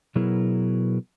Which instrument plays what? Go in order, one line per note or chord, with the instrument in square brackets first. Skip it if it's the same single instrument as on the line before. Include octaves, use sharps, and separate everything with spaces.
[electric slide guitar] B2 F#3 B3 E4 G#4 A#4